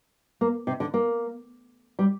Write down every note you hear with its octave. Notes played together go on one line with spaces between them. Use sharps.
A#3
C3
D3
A#3
G3